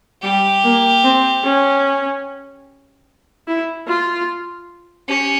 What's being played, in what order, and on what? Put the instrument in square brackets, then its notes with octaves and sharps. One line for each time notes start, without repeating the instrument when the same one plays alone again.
[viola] G3 [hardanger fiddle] G4
[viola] A#3
C4
C#4
E4
F4
[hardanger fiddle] C#4 [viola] G4